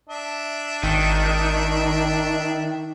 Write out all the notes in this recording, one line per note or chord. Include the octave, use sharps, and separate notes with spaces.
D4 E5
G#1 D#3